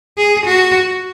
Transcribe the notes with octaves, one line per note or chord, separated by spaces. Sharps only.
G#4
F#4